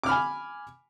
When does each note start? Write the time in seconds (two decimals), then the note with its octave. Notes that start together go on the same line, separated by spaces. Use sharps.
0.03 D6
0.06 F6
0.09 B5
0.11 G#5